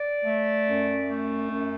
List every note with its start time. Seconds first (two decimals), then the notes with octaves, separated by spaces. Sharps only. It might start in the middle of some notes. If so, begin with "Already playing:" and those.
Already playing: D5
0.25 A3
0.66 F#2
1.08 A3
1.49 F#2